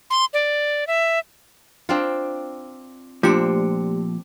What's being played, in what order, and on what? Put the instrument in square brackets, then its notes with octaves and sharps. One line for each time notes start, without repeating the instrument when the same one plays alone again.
[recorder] C6
D5
E5
[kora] C4 D4 F4
[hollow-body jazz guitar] A#2 F3 [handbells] A3 G4 C#7 [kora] C4 D4